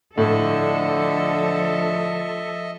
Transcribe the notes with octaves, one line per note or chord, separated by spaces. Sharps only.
A2 D3 F3 A4 D#5 E5